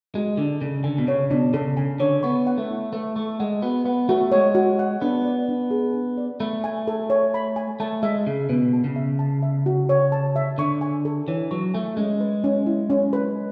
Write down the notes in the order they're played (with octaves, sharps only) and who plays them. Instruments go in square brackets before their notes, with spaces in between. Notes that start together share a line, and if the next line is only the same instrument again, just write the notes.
[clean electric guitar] G#3 [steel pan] F#4
[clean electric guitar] D3 [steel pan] D4
[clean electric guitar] C#3 [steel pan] A4
[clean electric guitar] D3 [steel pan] G#5
[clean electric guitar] B2
[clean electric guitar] C#3 [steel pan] C#5
[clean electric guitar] B2 [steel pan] D4
[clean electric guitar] C#3 [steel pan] A4
[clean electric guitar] C#3 [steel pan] G#5
[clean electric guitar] D3 [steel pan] C#5
[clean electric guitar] B3 [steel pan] C#6
[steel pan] F#5
[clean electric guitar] A3
[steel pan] E4
[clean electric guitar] A3 [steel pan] B4
[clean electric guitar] A3 [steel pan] C#6
[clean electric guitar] G#3 [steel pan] F#5
[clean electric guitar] B3 [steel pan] F#4
[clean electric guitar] B3 [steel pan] F#5
[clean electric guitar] A3 [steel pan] F#4
[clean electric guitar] G#3 [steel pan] C#5
[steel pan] F#4
F#5
[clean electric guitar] B3 [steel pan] D4
[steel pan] D5
D4
G#4
D4
D5
[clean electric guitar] A3 [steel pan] B5
[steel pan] G#5
A4
C#5
B5
G#5
[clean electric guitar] A3 [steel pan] A5
[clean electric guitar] G#3 [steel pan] E5
[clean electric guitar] C#3 [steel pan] G#4
[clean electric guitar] B2 [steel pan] B4
[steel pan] A5
[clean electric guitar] C#3
[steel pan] E5
A5
E5
F#4
C#5
A5
E5
[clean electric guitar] D3 [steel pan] C#6
[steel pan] G#5
A4
[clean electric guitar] E3 [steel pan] C#5
[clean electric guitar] F#3 [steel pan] C#6
[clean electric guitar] A3 [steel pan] G#5
[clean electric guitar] G#3 [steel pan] C#4
[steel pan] B4
C#4
E4
C#4
B4